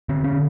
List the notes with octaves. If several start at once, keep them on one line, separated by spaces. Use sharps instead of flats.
D3 C4
C#4